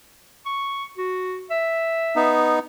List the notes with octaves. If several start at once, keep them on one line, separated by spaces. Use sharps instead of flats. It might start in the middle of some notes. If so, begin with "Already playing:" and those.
C#6
F#4
E5
B3 D#4